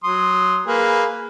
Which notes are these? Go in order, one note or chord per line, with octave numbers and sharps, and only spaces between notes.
F#3 C6 D#6
A#3 G#4 B4